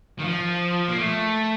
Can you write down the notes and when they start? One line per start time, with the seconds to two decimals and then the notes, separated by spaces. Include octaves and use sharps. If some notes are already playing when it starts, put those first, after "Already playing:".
0.19 D#3
0.24 F3
0.88 A#3
0.98 A3